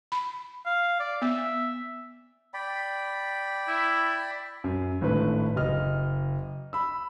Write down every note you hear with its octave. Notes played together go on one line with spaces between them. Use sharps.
B5
F5
D5
B3 E5
D5 G5 B5
E4
F#2
G#1 A2 D3 B4
F#1 D#5 F6
B5 E6